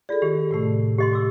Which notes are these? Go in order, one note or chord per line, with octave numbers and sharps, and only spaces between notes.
F4 G#4 A4 D5
D#3 G4
A2 C3 A3
G4 D#5 C6
D6 E6